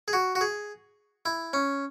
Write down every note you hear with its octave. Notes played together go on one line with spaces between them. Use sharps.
G#4
F#4
F#4
G#4
E4
C#4